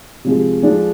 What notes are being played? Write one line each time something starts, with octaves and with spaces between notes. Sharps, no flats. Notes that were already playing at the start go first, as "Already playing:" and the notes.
C3 F3 G#3
D3 F3 G#3 D4